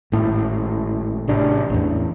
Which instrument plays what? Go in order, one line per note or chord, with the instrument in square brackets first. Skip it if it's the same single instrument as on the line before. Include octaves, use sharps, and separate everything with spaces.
[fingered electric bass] G#1 A2
A1 C3 D4
A1 E2